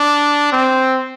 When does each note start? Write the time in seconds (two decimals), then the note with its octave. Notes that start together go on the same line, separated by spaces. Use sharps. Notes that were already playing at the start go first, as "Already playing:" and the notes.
Already playing: D4
0.52 C4